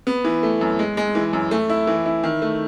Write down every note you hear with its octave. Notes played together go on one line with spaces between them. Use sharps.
B3
E3
A3
F#2
G#3
G#3
E3
F#2
A3
E4
E3
E4
D#3
A3